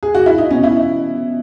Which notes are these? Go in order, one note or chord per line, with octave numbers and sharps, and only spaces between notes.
G#4
F#4
E4
D#4
B2 C#4
E4